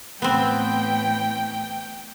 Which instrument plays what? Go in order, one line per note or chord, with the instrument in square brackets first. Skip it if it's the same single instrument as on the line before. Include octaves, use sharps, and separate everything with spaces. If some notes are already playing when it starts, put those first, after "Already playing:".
[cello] A2 E3 [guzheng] B3 C4 [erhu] G5